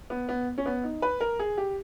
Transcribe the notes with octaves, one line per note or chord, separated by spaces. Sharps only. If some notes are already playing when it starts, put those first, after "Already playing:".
B3
B3
C#4
B3
D#4
B4
A#4
G#4
G4